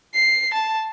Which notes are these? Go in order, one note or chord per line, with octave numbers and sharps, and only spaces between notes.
C7
A5